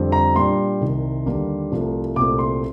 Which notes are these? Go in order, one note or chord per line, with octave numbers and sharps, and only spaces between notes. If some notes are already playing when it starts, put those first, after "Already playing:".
Already playing: F2 D3 G3 C4
A#5
A#2 G3 D4 C6
C2 C3 D#3
D#2 D3 G3 A#3 D4
C2 C3 F3 A3
C2 A#2 A3 C4 D6
C6